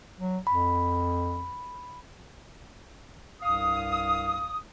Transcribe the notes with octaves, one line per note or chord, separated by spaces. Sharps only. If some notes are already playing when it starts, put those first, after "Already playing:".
F#3
F2 B5
C2 G2 F5 D#6